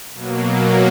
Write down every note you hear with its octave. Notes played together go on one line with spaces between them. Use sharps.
B2 F#3 A#3